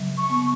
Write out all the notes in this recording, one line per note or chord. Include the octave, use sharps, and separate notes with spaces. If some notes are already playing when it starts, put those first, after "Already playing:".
Already playing: C#3 F#3
C#6
B3